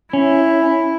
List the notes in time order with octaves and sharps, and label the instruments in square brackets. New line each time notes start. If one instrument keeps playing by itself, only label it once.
[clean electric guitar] C#4 [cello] E4